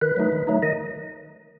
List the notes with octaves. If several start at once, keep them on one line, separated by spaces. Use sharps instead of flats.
D#3 B4
F#3 A3 D#4
D#3
F#3 A3 D#4
D#3 D#5